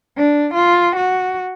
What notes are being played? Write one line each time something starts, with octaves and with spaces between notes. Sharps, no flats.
D4
F4
F#4